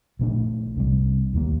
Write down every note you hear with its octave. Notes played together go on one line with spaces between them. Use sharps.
A#1 A#2 A3 D4
C2 C3 G3
D#2 D#3 G3 A#3